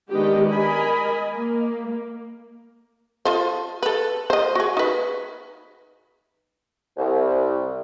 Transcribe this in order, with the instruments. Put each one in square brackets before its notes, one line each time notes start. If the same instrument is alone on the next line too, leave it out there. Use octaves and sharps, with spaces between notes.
[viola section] D#3 G#3 B3 D4 G4 D#5
A#4 D#5 G#5 B5
A#3
[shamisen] F4 A4 C5
A4 B4
C5 D#5
F#4 G#4
D#4 B4
[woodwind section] C2